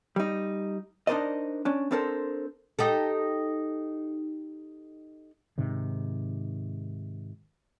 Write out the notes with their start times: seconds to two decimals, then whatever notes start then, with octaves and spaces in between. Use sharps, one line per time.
0.16 G3 D#4
1.07 D4 D#4 A#4 C5 D5 D#5
1.65 C#4 D4
1.91 C4 D4 A4 A#4 C5
2.79 D#4 G4 A4
5.58 G#2 C3 D#3